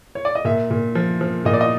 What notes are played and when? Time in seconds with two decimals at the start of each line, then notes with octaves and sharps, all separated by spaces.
0.15 C#5
0.25 D5
0.35 D#5
0.45 A#2 E5
0.70 A#2
0.95 F3
1.21 F3
1.45 A#2 D#5
1.53 D5
1.61 D#5